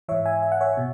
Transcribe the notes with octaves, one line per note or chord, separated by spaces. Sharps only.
G#2 E3 C#5 E5
E5 G#5
E5
F#5
C#5 E5
B2